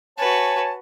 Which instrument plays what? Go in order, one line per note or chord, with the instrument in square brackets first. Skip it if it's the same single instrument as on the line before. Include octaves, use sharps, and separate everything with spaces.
[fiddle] F#4 B4 [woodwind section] C#5 G#5 A5